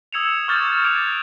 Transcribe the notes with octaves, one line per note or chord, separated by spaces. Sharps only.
D#6 E6 G#6 C#7 E7 F7
C#6 D6 F6 G6 A6
D6 F#6 G#6 D7 F7